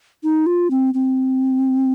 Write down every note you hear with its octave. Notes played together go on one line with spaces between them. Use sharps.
D#4
F4
C4
C4